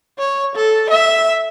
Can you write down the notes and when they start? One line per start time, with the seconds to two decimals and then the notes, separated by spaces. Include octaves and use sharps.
0.19 C#5
0.55 A4
0.90 E5